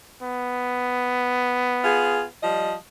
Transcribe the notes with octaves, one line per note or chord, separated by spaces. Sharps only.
B3
F4 G#4
F3 G3 D#5